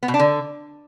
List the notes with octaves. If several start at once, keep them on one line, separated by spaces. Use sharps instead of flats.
B3
B2
D4
D3